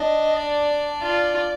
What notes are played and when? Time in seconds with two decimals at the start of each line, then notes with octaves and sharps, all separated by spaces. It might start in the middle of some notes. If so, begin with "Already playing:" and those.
Already playing: D4 D#5
0.36 D5
1.02 F4